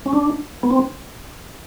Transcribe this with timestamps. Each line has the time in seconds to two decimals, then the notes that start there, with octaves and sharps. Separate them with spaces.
0.06 C#4
0.13 D4
0.63 B3
0.71 C4